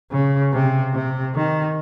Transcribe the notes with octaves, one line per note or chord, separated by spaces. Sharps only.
C#3
C3
C3
D#3